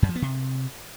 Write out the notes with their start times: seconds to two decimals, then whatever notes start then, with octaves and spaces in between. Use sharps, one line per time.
0.02 F#2
0.09 F3
0.16 B3
0.22 C3